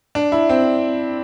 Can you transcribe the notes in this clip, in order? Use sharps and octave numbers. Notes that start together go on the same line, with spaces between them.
D4
E4
C4